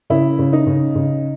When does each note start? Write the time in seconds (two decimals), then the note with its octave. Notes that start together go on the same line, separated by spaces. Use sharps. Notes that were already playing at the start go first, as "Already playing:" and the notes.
0.10 C#3 E4
0.39 C#3
0.53 D#4
0.67 C#3
0.95 C#3